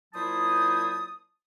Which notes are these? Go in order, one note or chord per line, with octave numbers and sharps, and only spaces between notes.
A#2 F#3 E4 C5 A5 D#6